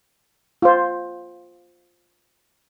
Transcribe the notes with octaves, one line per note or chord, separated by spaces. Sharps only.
F4 C5